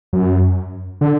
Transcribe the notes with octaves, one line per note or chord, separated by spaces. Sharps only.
F#2
D3